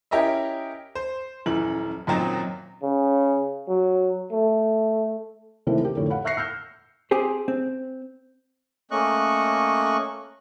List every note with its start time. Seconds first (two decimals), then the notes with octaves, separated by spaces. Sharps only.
0.11 C#4 E4 G4 A#4 D#5 E5
0.95 C5
1.46 D#1 F#2 E3 F#7
2.07 F#2 A#2 D#3 F#3 C4 D#4
2.83 C#3
3.68 F#3
4.32 A3
5.67 C3 D#3 E3 A3 A#3 C4
5.80 G4 A#4
5.96 F2 A2 D3 C#5
6.10 F5 F#5 B5
6.25 E5 C#6 F#6 A#6 C7 C#7
6.37 E6 F6 G6 A#6
7.11 C4 G4 G#4 C5
7.48 C4
8.91 A3 A#3 C#4 D#5 C#6 F#6